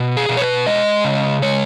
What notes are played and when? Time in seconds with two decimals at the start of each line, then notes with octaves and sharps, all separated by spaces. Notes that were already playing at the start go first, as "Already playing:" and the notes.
Already playing: B2
0.17 G#4
0.29 B2
0.37 C#5
0.42 B4
0.66 G#3 D#5
1.04 C#3
1.42 G#3 C#5